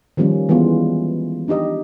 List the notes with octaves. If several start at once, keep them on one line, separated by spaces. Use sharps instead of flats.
D#3 F3 G3 A#3 C#4
E3 G#3 B3 F4
D4 D#4 G4 D#5